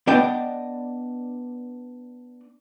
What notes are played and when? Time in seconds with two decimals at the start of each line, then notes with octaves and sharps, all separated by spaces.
0.07 B3 D4 D5 D#5 G5